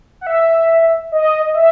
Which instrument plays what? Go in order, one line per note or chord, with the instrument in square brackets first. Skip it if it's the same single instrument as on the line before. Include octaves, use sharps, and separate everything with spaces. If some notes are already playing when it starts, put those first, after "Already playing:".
[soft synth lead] F#5
E5
D#5
E5